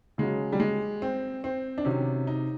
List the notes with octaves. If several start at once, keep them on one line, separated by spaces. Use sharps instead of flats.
C#3 F#3 G#3
G3
G#3
C4
C4
D4
C3 D#3 F#3 C#4
D#4